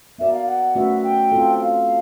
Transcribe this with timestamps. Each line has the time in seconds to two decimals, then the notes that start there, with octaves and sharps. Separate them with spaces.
0.18 B3 D#4 F#4 A#4 D5 E5
0.33 F5
0.47 F#5
0.75 A3 C#4 F#4 B4 E5
1.03 G5
1.32 C4 F4 A4
1.60 F5